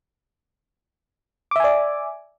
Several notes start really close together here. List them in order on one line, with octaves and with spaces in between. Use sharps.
D6 E5 G#5 D5